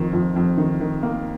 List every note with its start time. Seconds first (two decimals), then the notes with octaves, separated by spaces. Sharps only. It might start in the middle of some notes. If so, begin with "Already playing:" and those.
Already playing: F2 D#3
0.13 F2
0.36 F2
0.58 D#3
0.80 D#3
1.03 A#3